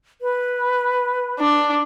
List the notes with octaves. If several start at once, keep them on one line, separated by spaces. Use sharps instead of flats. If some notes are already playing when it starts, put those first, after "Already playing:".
B4
D4